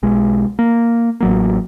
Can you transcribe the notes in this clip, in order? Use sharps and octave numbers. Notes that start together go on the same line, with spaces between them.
B1 G#3
A#3
A1 F#3 A#3